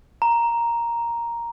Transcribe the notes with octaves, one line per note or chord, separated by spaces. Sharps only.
A#5